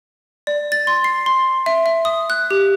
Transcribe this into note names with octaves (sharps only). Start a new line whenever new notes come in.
D5
A6
C6
C7
C6
E5
E5
D#6
F#6
G4